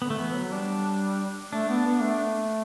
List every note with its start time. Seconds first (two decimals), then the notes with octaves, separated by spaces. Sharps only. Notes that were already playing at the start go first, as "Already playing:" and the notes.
0.02 D3 B3
0.10 A3
0.18 E3 B3
0.35 F#3
0.52 G3 D4
1.52 A3 D4
1.69 B3
1.86 B3
2.02 A3